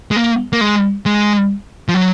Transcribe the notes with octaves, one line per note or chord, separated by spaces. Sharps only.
G#3
A#3
A#3
G#3
G#3
F3
F#3